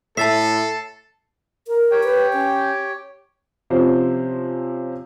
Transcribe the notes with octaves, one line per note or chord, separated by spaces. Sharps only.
A2 A4 E5 A5 A6 C7
A#4
G4 C#5 G5
B4
C#4
C3 F3 C#4 C5